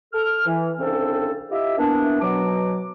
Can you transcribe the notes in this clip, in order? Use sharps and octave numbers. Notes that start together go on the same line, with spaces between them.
A4 F6
E3
C2 C#3 C4 D4 A4 C5
E4 F4 G4 D#5 E5
E3 A#3 B3 D4
B2 F#3 D6